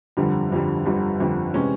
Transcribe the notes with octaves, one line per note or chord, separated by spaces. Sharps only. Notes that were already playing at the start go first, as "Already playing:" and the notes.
G1 F2 D3 G3
G1 F2 D3 G3
G1 F2 D3 G3
G1 F2 D3 G3
C3 E3 G#3 C#4